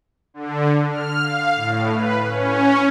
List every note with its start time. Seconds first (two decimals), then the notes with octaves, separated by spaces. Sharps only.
0.34 D3
0.88 F6
1.23 F5
1.56 A2
1.93 B4
2.24 C#4